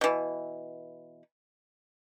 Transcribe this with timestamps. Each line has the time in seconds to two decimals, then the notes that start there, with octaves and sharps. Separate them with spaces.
0.01 B2 E3